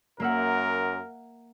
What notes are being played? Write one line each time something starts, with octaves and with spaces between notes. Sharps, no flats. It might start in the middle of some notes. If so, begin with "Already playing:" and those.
F#2 A#3 A#4 E5 F#5